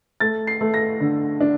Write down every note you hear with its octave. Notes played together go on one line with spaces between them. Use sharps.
A3 A6
C7
A3
A#6
D3
D4